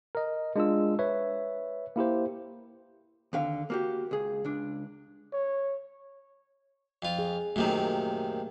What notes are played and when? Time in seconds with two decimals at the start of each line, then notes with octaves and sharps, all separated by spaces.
0.15 A#4 D#5
0.56 G#3 D4 F4 E6
0.99 B4 C#5 E5
1.96 A#3 E4 G4 C5
3.33 D#2 D3 F5
3.70 A#3 F#4 G4
4.11 C#2 G#4
4.45 C#2 D4
5.33 C#5
7.02 F2 F4
7.19 G#4
7.56 F#2 C3 D#3 A3 A#3